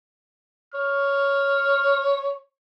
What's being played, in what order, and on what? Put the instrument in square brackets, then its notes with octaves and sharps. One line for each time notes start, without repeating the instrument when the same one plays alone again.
[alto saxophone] C#5 [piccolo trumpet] F6